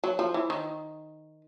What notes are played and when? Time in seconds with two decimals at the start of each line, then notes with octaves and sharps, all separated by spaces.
0.04 F#3
0.19 F3
0.34 E3
0.50 D#3